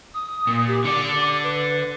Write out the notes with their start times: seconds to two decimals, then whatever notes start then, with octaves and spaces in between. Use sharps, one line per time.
0.14 D#6
0.47 A#2
0.67 G4
0.84 D3 D5 D6
1.43 B4